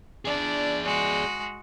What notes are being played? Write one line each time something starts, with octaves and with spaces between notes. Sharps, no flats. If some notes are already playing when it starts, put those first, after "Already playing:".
D4 G#4 D5
G#3 F#4